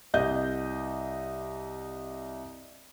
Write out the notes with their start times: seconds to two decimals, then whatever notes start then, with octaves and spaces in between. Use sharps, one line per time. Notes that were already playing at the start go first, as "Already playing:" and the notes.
0.14 C2 D#5 G6